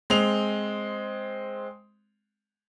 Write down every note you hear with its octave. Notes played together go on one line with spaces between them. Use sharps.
G#3 C4 F7